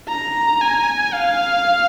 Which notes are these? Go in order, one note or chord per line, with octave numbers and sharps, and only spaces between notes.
A#5
G#5
F5